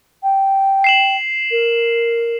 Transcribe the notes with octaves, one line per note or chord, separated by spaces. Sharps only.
G5
C7 E7 F#7
A#4